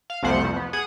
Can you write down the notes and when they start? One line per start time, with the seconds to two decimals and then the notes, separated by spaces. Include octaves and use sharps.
0.10 F5
0.23 C2 F2 F3 A3 C5 F#5
0.43 F2
0.56 B3
0.73 G#4 F#5 D#6